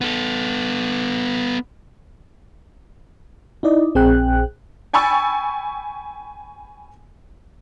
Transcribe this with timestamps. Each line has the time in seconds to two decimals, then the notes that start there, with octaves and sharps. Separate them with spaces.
0.01 B3 A4
3.63 D#4 E4 D5 D#5
3.95 A#1 C4 G#4 G5 F#6
4.93 G5 G#5 B5 C#6 E6 A6